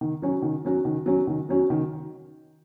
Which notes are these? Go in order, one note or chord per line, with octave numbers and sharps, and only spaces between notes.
D#3
F#3 C#4 F#4
D#3
F#3 C#4 F#4
D#3
F#3 C#4 F#4
D#3
F#3 C#4 F#4
D#3